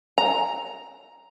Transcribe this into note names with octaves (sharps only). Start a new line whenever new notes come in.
A#5